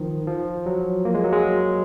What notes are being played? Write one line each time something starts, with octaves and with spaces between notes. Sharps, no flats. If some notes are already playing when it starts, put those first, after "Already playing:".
Already playing: D#3 F3
F3
F#3
A#3
G#3
F#3
G#3